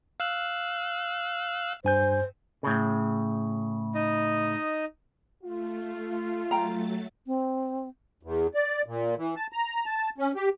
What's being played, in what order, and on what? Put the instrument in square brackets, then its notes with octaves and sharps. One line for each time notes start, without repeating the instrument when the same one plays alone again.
[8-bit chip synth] F5 E6 F#6
[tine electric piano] G2 G#5 G6 [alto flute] C5
[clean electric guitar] A2 C#3
[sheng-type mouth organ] D#4 D#5
[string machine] A3 [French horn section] F4
[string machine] F#3 A3 A6 [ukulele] G5 A#5
[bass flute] C4
[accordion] E2
D5
A#2
E3
A5
A#5
A5
C#4
G4